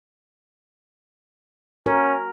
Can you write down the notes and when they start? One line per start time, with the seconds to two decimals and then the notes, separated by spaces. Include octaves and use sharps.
1.86 C#4 F#4 A#4